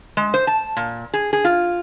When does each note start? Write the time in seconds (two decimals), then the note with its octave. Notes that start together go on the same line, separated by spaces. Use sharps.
0.17 G#3
0.34 C5
0.47 A5
0.77 A#2
1.13 G#4
1.33 G#4
1.44 F4